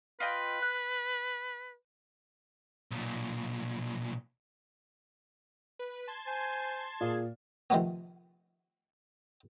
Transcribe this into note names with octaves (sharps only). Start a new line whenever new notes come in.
F4 B4 D#5 G5
F#6
B1 A#2
B4
A5 C6 G#6
C5 G#5
A#2 G#4
C3 D#3 F3 G#3 A3 B3